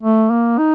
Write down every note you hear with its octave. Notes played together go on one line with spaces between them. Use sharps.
A3
A#3
D#4